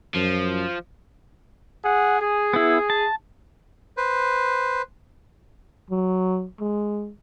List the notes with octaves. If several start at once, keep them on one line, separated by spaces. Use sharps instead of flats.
F#2 F3
G#4 F#5
G#4
B3 E4
A5
B4 C5
F#3
G#3